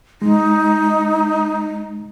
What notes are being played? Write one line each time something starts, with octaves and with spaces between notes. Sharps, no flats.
G#3 D#4